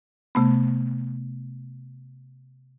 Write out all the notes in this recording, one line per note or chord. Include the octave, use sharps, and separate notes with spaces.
C3 A3 B3